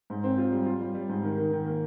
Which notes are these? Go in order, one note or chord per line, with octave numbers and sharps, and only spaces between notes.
G#2
C4
F4
G3
F4
G3
G3
G#2
D#3
D#3
D#3
A#3